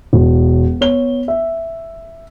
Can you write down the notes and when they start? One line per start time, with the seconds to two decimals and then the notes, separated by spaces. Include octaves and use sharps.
0.13 E1
0.81 B3 C#5 G7
1.28 E5